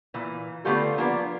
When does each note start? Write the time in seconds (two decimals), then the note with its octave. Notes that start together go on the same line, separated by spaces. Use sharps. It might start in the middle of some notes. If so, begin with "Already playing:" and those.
0.14 A#2 E3
0.65 D3 A3 B3 F4 G4 A4
0.98 F3 A#3 B3 D4 F4